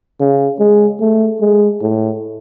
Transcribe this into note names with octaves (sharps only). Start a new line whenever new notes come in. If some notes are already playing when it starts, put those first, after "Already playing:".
C#3
G#3
A3
G#3
A2